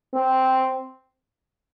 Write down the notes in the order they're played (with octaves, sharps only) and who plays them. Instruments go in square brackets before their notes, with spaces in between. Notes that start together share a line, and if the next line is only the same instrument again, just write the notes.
[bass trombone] C4